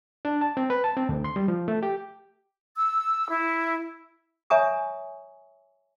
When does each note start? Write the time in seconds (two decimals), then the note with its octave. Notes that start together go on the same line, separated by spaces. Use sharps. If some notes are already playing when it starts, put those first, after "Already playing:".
0.25 D4
0.41 A5
0.57 C4
0.70 B4
0.84 A5
0.97 C4
1.09 D2
1.24 C6
1.36 G3
1.48 F3
1.68 A3
1.83 G4
2.77 E6
3.29 E4
4.50 C#5 E5 G#5 A#5 C#6 D#6